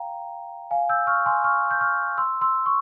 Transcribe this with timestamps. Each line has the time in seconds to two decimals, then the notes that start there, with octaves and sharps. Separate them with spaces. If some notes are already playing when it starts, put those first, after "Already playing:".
Already playing: F5 G5 A#5
0.71 F5 G#5
0.89 E6 G6
1.07 C#6 F6
1.26 G#5 C6
1.44 C#6 F6
1.71 G6
1.80 C#6 F6
2.18 C6 E6
2.41 C6 E6
2.66 C#6